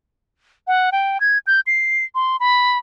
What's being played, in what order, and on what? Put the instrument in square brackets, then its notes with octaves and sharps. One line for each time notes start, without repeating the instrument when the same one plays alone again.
[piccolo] F#5
G5
G#6
G6
C7
C6
B5